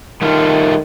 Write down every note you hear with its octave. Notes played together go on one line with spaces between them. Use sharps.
D#3 G3 A3 F4